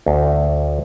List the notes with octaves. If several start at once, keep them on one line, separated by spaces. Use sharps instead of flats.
D2